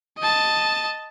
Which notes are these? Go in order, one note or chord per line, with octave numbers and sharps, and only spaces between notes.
D#5 A5